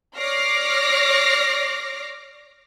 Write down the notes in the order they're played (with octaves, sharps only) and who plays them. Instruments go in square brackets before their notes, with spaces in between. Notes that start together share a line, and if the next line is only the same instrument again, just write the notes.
[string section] C#5 D5 D6 F6 A#6 C7